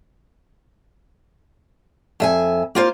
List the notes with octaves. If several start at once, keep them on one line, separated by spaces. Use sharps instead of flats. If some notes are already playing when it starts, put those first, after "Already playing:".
F2 E5 G#5
A#3 F4 C5